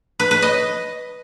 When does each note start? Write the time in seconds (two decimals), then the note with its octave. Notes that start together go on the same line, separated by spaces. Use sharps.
0.20 B4
0.31 B4
0.42 D#5